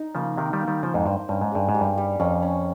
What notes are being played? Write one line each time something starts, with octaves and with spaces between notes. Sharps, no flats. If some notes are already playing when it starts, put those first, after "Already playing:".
Already playing: D#4
C#3 F3 A#3
C3 D#3 A#4
D#3 G3
A#3
D#3 G3
C#3 F3 C5
F2 G#2
G2 C5
G2 C#4
G#2
G2 G#4
G#2
G3
G2
G3
F2 C#4
C#4